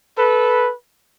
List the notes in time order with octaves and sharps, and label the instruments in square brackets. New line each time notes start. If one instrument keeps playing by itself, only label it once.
[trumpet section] A4 B4